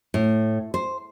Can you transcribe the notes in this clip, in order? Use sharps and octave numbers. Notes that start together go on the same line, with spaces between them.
A2
C5